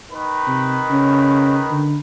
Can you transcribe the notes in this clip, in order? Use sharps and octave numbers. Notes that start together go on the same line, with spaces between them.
D#3 B4
C3
C#3 C#4
D3